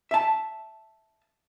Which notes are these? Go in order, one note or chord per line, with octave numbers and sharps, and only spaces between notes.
E5 A5